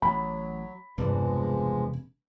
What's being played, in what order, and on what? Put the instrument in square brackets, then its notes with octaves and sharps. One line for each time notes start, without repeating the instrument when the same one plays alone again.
[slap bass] A1 [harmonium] F#3 [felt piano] B5
[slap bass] E1 C3 A#3 [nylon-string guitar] E2 G2 [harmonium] F3 G#3